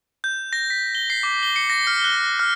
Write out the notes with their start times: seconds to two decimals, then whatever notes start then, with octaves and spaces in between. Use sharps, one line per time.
0.24 G6
0.53 A#6
0.70 B6
0.95 G7
1.10 C7
1.23 D6
1.43 G7
1.56 C#7
1.70 A#6
1.87 F6
2.04 F#6
2.40 F6